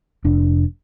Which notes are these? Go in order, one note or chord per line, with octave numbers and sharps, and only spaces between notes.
F1 D4